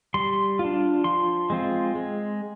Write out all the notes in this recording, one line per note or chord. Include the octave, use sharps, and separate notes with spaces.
G3 C6
F4
D4
F3 C6
G#3 C4 F4
G#3